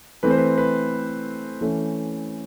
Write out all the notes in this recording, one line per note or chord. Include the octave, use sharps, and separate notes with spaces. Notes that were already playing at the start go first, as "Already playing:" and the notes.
E3 A3 C4 B4
C5
B4
B4
E3 A3 C#4